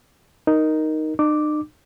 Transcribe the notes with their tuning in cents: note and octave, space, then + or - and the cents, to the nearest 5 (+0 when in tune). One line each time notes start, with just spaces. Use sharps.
D#4 +0 A#4 +5
D#4 -45 D6 +0